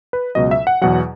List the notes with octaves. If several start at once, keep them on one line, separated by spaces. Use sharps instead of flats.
B4
C#2 B2 F#3 D#5
E5
F#5
E2 B2 F#3 F#5